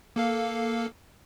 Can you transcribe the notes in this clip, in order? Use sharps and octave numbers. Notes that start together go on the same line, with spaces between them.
A#3 A4 F5